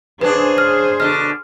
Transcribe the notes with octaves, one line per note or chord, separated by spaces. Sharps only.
C#3 D4 G#4 B4 C5
F6
B2 D3 F6